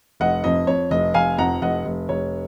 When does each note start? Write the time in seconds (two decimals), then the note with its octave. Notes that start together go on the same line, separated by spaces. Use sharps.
0.20 F1 D#5 F#5
0.44 F2 D#5
0.67 F2 C#5
0.91 F1 D#5
1.14 F1 F5 G#5
1.38 F2 F#5 A#5
1.61 F1 D#5 F#5
1.85 F1
2.09 F1 C#5